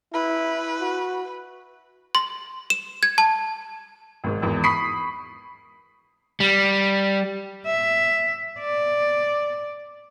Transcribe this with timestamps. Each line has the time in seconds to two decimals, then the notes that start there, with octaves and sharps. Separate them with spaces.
0.14 E4 B4
0.81 F#4
2.15 C6
2.70 E7
3.03 G#6
3.18 A5
4.24 G#1 G#2
4.42 G#1 E2
4.63 B5 C#6 D#6 B6 C7
6.40 G3
7.67 E5
8.60 D5